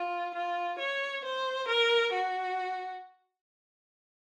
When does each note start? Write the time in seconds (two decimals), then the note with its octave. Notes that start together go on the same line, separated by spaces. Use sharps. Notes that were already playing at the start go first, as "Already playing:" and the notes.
Already playing: F4
0.35 F4
0.79 C#5
1.25 C5
1.69 A#4
2.13 F#4